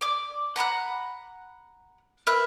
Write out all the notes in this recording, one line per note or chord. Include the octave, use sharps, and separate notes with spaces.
D5 D6
F#5 A#5 B5 F#6
A#4 B4 E5 F#6